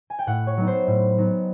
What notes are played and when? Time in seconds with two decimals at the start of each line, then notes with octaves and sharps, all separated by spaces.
0.10 G#5
0.19 G5
0.27 A2 F#5
0.47 C#5
0.57 F#3 B3 D#4
0.67 C5
0.87 A2
1.18 F#3 B3 D#4